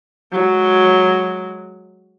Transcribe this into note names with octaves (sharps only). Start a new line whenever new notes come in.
F#3 G#3